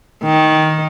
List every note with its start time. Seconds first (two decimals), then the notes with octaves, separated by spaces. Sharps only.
0.24 D#3